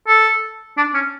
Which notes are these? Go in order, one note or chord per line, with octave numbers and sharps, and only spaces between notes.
A4
D4
C#4